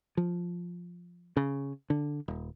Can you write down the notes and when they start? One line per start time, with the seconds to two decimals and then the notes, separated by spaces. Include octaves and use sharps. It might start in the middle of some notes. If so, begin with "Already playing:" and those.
0.17 F3
1.37 C#3
1.90 D3
2.28 D#1